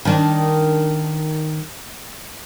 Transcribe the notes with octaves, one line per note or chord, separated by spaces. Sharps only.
D#3 D4